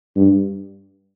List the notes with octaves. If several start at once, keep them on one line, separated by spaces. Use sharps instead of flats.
G2